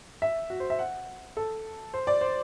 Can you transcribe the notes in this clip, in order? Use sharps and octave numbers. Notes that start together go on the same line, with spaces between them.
E5
F#4
C5
E5
F#5
A4
C5
D5
C5